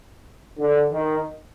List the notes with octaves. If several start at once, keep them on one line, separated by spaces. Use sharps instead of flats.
D3
D#3